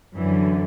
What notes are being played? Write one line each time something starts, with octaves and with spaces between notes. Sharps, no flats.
F#2 D3 E3